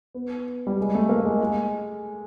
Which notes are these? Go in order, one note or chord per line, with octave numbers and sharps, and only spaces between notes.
B3
G3
G#3
A3
A#3
G#3
G#3